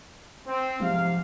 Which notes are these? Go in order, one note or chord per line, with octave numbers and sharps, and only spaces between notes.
C4
G#2 C3 F3 F5